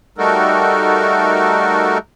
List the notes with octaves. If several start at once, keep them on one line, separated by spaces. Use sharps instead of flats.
G3 A3 D#4 F#4 A4 A#4